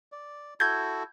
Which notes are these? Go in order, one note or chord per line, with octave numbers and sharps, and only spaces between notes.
D5
E4 F#4 A4 G6 G#6